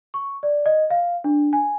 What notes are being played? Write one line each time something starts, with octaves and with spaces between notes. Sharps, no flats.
C#6
D5
D#5
F5
D4
G#5